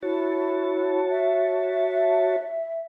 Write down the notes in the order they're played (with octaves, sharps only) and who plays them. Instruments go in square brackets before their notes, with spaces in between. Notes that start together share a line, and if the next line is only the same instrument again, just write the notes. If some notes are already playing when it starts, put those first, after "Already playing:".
[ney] E4 [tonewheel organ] F#4 C#5 A5
[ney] E5